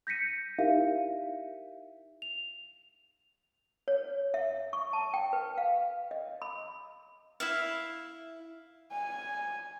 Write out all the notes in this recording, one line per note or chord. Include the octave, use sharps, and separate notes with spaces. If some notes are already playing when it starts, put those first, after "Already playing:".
G6 A#6 B6 C#7 D#7
D#4 E4 G4 A#4 E5 F5
F7
C#5
E5
C#6
A5
G5
B4
F5
D#5
B5
E4 E5 F5
G#5